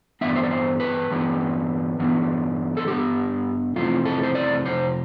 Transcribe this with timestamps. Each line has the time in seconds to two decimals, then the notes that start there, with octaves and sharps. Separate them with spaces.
0.21 G2 E3 B3 D4 E5
0.29 D5
0.36 C5
0.43 D5
0.51 C5
0.80 B4
1.10 G2 E3 B3 D4
1.99 G2 E3 B3 D4
2.77 A4
2.87 G2 E3 B3 D4 G4
3.75 F2 C3 E3 A3 C4 F4
4.05 A4
4.23 C5
4.35 D5
4.65 F2 C3 C5